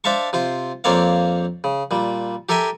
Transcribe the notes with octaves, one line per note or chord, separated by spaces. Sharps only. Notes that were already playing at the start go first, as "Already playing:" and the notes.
D4 C5 E5 F5 A5 C#6
C3 F4 C5
F2 A#3 C4 C#5 D5 F5
C#3
A#2 G3
G4 A4 A#4 E5 G5 G#5